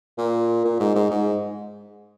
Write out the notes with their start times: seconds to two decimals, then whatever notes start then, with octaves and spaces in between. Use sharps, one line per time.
0.18 A#2
0.65 A#2
0.80 G#2
0.95 G#2
1.10 G#2